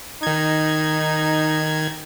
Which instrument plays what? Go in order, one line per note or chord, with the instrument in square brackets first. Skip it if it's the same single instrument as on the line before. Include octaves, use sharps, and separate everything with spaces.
[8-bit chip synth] D#3 G#6 [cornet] D#4